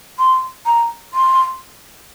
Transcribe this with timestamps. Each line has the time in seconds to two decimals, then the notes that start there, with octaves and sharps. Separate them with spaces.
0.19 C6
0.66 A#5
1.13 C6